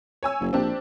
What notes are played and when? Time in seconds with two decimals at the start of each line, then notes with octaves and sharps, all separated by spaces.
0.23 C#5 G#5 E6
0.40 F#1
0.53 A#1 C4 D4 G4